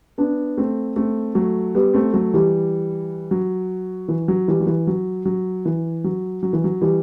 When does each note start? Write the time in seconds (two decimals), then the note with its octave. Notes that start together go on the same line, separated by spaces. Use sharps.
0.18 B3 D4
0.57 A3 C4
0.96 A3 C4
1.35 F#3 A3
1.75 G3 B3
1.94 A3 C4
2.14 F#3 A3
2.34 E3 G3
3.31 F#3
4.08 E3
4.28 F#3
4.48 E3 G3
4.60 F#3
4.67 E3
4.87 F#3
5.25 F#3
5.65 E3
6.04 F#3
6.43 F#3
6.53 E3
6.64 F#3
6.81 E3 G3